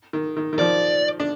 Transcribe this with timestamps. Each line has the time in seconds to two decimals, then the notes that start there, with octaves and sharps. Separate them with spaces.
0.13 D#3
0.37 D#3
0.53 D#3
0.59 F3 D5
1.20 D4